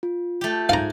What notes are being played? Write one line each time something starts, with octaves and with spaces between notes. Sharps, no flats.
F4
A3 G4
G#2 F5 G#5 A#5